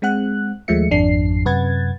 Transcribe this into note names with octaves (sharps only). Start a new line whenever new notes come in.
G#3 C4 F#5 F#6
D#2 F3 G#3 A3 E5 C#7
G#1 F2 D4 C7
F#2 C3 B4 F#5 G#6 A6